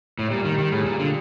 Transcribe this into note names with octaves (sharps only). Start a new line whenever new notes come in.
A2
A#2 G3
D#3
G3
D#3
A2 G#4
A#2
F4
D3